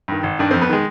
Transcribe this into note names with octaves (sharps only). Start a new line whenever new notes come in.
G2 D#3
G#1
G2 D#3 D4
F2 C4
B3
D#3 G#3